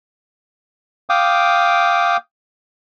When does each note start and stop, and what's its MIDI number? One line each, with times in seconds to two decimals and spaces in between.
1.10 2.17 77
1.10 2.17 79
1.10 2.17 86
1.10 2.17 87